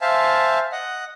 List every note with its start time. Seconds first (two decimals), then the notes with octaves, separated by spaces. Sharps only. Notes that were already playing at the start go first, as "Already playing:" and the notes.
0.01 C5 E5 F5 G#5 A5
0.72 D#5 F#5